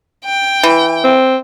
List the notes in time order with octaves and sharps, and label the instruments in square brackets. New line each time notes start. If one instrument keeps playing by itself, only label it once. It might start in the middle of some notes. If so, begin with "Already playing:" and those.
[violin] G5
[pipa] E3
[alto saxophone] C4